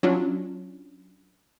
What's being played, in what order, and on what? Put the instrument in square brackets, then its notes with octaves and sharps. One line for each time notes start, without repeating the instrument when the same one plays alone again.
[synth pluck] F#3 C#4 D4 F4